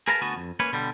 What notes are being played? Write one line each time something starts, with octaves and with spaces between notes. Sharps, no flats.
G#4 A#4 B4 F5 A5 A#5
D2 B3 F#4 G#5 A5
F2
A#3 C#4 B4 C#5
B2 D3 G3